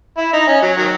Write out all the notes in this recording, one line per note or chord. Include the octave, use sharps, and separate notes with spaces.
E4
D#4
C#4
F#3
D#3 F#3